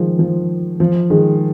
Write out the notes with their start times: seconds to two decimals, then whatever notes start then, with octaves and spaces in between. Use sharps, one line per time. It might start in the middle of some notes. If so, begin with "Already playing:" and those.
Already playing: D#3 F3 G#3
0.19 F3
0.80 F3
1.10 D#3 G#3